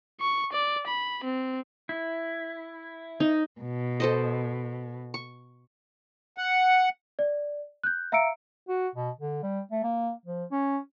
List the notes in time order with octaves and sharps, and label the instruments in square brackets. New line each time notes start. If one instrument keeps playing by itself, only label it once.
[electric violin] C#6
D5
B5
C4
[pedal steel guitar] E4
[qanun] D#4
[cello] B2
[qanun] A4 C5 D#5
C#6
[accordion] F#5
[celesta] D5
F#6 G6
E5 F5 A#5 E6 C#7 D7
[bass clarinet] F#4
B2
D3
G3
A3
A#3
F3
C#4